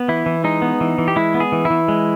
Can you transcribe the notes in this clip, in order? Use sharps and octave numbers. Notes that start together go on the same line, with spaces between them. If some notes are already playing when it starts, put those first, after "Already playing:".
Already playing: B3
E3 E4
E3
G#3 D#4
B3
E3
E3
G4
G#3 E4
B3
G#4
E3
E4
E3
G#3